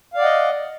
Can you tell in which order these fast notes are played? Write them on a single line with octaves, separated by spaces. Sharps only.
F5 D5 F#5 D#5